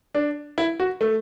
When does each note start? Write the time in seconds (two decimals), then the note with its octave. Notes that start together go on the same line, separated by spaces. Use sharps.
0.15 D4
0.58 E4
0.80 F#4
1.01 A3